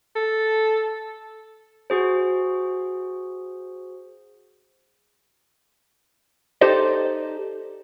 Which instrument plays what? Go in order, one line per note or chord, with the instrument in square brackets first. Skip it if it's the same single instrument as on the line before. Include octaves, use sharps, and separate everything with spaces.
[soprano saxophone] A4
[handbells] F#4 G#4 C5
[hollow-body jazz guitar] D#4 G4 A4 C5 D5 D#5